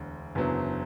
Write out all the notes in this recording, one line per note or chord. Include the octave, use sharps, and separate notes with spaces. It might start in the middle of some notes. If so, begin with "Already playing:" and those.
Already playing: E1 D2 D3
F#1 E2 D3 F#3